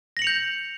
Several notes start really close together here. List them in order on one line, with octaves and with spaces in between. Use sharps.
A#6 F#7 C#7 F7 G6